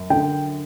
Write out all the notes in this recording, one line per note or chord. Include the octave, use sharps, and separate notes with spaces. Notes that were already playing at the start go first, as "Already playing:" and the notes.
Already playing: F#2
D3 G5